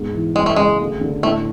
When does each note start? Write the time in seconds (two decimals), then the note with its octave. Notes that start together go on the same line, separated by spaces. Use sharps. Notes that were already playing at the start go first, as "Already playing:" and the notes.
Already playing: G#2 B2
0.14 E3
0.36 F#2 G#3
0.46 A3
0.56 C#3 G#3
0.80 D2
1.01 D3
1.23 A2 A3